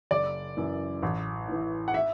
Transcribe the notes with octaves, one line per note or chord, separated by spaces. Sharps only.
F#1 D5
F#2 E3
A1
A2 E3
F#5
E5